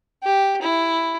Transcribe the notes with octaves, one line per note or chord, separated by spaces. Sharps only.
G4
E4